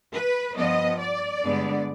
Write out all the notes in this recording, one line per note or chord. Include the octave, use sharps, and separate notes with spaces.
B4
G2 F3 B3 D#5
D5
G2 D3 G#3 B3